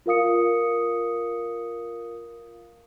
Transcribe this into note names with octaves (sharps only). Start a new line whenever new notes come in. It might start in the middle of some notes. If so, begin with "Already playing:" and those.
F4 A#4 F5 D#6 C#7